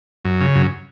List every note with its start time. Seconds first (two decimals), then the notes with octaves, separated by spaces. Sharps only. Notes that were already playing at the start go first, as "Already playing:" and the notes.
0.25 F#2
0.41 C#3
0.55 F#2